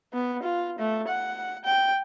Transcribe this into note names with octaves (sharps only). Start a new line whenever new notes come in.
B3
F4
A3
F#5
G5